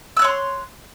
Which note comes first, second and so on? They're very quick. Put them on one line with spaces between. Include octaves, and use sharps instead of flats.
E6 F#6 C#5 C6